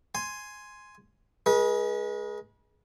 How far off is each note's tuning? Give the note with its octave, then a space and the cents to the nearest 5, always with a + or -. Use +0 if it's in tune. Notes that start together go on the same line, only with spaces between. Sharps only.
G#5 +5 C6 +0
G#3 +10 B4 -40